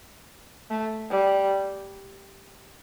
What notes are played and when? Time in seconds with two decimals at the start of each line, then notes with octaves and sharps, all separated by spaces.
0.71 A3
1.10 G3